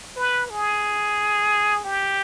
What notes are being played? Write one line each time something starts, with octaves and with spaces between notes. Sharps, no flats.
B4
G#4
G4